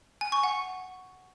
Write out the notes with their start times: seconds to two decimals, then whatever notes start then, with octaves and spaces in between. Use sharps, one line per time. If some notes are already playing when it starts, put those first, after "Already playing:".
0.21 G#5
0.32 C#6
0.43 F#5